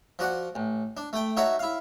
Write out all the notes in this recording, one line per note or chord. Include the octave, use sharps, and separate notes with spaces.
F3 F#4 D5 F#5
A1
D4
A3 G5
D#4 F#4 C#5 E5 F#5 A5
E4 F5